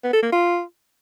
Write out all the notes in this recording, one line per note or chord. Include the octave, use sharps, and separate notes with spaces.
B3
A4
A#3
F4